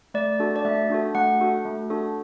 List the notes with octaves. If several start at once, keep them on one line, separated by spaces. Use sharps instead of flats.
A3 D5
D4 F#4 A4
D5
A3 E5
D4 F#4 A4
A3 F#5
D4 F#4 A4
A3
D4 F#4 A4